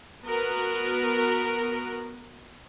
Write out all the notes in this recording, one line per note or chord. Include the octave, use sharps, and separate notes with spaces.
B3 F#4 A#4 B4